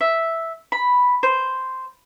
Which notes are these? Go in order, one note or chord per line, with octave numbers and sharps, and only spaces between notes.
E5
B5
C5